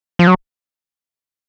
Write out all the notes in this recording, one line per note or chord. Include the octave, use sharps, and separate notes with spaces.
F3
F#3